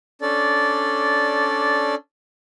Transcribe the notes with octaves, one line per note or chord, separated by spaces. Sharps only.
C#4 D4 A4 D5